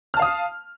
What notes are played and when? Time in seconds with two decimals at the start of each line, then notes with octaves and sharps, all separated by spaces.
0.14 F6
0.17 A5
0.19 F5
0.22 D#6